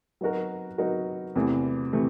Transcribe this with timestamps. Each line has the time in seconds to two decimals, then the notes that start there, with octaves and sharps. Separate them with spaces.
0.21 F#3 B3 D#4 F#4 A#4
0.78 F#3 B3 D#4 F#4 A#4
1.36 E2 C3 E3 A3
1.93 C3 E3 A3